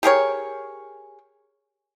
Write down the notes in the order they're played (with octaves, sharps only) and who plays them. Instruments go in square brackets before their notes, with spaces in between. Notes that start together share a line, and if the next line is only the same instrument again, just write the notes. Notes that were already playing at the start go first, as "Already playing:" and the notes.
[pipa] G4 G#4 A#4 C#5